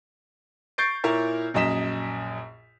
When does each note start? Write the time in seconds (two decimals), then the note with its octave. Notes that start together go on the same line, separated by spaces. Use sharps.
0.78 C#6 G6 A6 C7 D7
1.04 A#2 E4 A#4 C#5
1.54 A#1 F#2 D#5 B6 E7